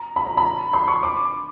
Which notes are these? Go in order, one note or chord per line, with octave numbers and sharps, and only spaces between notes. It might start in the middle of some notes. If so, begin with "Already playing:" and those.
Already playing: A#5
B5
A#5
B5
C6
C#6
D6